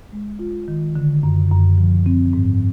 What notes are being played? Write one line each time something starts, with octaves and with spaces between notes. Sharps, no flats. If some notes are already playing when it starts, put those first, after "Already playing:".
G#3
F4
D#3
D3
F#2
F#2
F3
C4
G#2